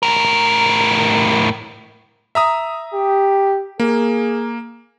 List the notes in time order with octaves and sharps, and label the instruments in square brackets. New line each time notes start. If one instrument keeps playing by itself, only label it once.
[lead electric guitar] A2 A#4
[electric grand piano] E5 A#5 D#6
[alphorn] G4
[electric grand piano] A#3 [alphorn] G#4